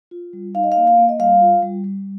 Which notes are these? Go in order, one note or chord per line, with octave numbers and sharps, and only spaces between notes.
F4
G3
D#4 F5
D#5
F5
A#3
F5
A#3
D#5
G3 F5
F4
G3
G3